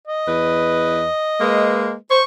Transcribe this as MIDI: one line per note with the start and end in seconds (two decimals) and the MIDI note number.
0.08 1.95 75
0.27 1.05 40
0.27 1.05 71
1.40 1.92 56
1.40 1.92 58
1.40 1.92 71
2.10 2.21 72
2.10 2.24 85